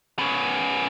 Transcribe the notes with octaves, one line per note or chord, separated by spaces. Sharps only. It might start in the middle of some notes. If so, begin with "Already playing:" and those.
B3 C#4